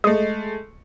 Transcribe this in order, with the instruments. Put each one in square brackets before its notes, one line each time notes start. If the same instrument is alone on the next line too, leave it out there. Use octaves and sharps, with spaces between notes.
[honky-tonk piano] G#3 A3 [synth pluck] D#5